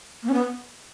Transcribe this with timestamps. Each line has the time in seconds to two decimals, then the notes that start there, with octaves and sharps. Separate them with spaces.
0.23 A#3
0.29 C#4
0.34 B3